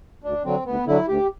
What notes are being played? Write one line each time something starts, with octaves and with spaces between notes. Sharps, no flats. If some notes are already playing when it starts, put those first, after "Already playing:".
D2 D4
D3 F#3 C4
D2 B3
D3 F#3 E4
D2 G4